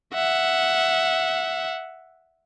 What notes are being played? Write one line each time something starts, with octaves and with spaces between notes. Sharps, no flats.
E5 F#5